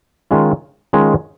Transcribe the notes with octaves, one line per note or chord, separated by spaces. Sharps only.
D#3 G#3 C#4 F4
D#3 G#3 C#4 F4